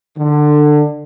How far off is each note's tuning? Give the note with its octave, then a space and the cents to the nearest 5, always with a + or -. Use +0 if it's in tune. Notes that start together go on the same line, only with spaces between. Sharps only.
D3 +20